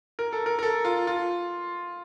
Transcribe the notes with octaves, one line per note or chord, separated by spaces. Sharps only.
A#4
A4
A#4
A#4
A4
F4
F4